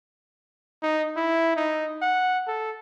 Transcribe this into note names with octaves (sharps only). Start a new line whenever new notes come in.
D#4
E4
D#4
F#5
A4